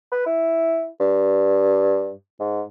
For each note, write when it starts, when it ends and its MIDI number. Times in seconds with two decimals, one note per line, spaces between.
0.12 0.24 71
0.26 0.87 64
1.00 2.13 43
2.40 2.63 44